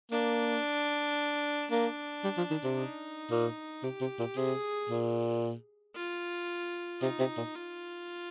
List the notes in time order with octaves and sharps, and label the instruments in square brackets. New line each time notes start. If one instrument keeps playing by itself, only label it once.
[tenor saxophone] A#3 [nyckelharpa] D4
[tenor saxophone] A#3 [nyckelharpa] D4
[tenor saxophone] G3
F3
D#3
C3
[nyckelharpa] D#4
[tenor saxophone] A#2
[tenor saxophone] C3 [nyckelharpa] G4
[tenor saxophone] C3
A#2
[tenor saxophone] C3 [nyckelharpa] G#4
[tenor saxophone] A#2
[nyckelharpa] F4
[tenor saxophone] C3 [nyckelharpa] D#4
[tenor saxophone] C3
A#2
[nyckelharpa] F4